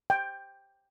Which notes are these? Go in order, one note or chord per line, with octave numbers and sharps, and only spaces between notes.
G5